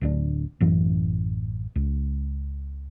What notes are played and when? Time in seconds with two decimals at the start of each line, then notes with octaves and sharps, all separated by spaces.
0.01 D1 D2 D4
0.60 A1 F#2 E3
1.76 C#2